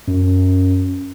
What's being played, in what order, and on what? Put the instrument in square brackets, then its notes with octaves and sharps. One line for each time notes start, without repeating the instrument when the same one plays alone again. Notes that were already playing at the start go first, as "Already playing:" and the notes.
[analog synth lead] F#2